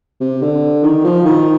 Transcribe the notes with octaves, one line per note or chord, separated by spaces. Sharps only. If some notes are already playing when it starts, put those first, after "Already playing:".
C3
D3
D#3
F3
D#3